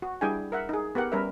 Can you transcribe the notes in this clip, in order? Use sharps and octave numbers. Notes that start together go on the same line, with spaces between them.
F#4
G3 D4 E4 G#4 G5 G#5
A#4 E5 F#5
D#4 G#4
B3 G4 A#4 F#5
G3 C#4 A#4 B4 E5